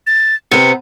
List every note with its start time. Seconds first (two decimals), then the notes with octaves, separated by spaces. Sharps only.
0.07 A6
0.51 C3 B3 C#7